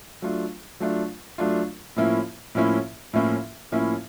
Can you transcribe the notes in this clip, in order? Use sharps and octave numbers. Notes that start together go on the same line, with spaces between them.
F#3 A3 D4 F4
F#3 A3 D4 F4
F#3 A3 D4 F4
A2 F3 A#3 C#4 E4
A2 F3 A#3 C#4 E4
A2 F3 A#3 C#4 E4
A2 F3 A#3 C#4 E4